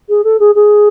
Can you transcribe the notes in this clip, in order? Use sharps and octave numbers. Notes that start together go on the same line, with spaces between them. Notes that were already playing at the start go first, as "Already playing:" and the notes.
G#4
A4
G#4
G#4